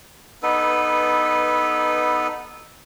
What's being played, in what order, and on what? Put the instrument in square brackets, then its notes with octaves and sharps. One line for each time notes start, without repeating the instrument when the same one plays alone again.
[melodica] B3 D#4 A4 B4